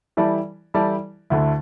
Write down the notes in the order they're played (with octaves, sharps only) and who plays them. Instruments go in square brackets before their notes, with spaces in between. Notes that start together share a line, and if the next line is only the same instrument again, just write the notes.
[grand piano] E3 G3 E4 A4 D5
E3 G3 E4 A4 D5
D2 D3 A3 E4